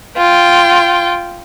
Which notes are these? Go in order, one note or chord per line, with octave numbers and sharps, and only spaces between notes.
F4 G5